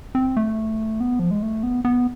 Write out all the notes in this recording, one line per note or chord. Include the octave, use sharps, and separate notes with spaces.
C4
A3
B3
F3
G#3
A3
B3
B3